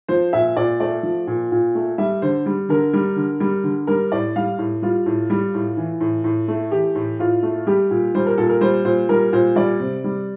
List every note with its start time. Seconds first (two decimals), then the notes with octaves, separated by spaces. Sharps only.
0.08 F3 C5
0.33 A#2 E5
0.56 A#2 D5
0.80 A3 D5
1.03 F3
1.27 A#2
1.52 A#2
1.75 A3
1.98 G3 E5
2.22 D3 C5
2.46 G3
2.69 D3 A#4
2.93 G3
3.16 D3
3.40 G3
3.64 D3
3.87 G3 A#4
4.12 A2 D5
4.36 G3 F5
4.58 A2
4.82 G3 F4
5.06 A2
5.30 G3
5.54 A2
5.77 E3
6.00 A2
6.24 A2
6.48 A3
6.71 E3 G4
6.95 A2
7.19 A2 F4
7.43 A3
7.67 G3 G4
7.91 A#2
8.15 G3 C5
8.26 A#4
8.38 A#2 A4
8.49 A#4
8.61 G3 C5
8.85 A#2 C5
9.09 G3 A#4
9.33 A#2 C5
9.56 G3 D5
9.80 C3
10.04 G3